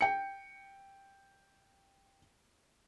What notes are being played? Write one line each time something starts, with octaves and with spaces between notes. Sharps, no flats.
G5 C#7